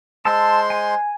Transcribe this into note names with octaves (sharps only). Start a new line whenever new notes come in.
G#3 C5 A5 C6 E6
G#5